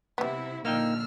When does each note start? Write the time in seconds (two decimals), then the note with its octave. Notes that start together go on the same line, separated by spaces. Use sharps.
0.18 C3 G3 B3 E4 E5
0.65 A#2 D3 F3 A#3 D#4 G5 E6 F6